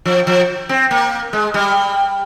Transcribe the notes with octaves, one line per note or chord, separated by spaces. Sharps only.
F3
F3
C4
A#3
G#3
G3